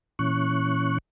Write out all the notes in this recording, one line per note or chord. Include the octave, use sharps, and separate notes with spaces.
A#2 E3 C#4 C#6 F#6